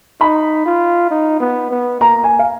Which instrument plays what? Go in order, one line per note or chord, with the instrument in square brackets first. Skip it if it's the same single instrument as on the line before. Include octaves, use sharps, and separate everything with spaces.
[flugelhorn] D#4 [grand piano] B5
[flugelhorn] F4
D#4
B3
B3
[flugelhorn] A#3 [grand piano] A#5
[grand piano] G#5
F5